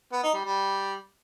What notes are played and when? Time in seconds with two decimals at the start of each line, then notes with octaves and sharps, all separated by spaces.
0.13 B3
0.23 D#4
0.34 G3
0.45 G3